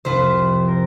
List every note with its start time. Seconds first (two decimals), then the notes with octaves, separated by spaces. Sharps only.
0.05 C2 F2 F4 B4 C5
0.68 A#4 C5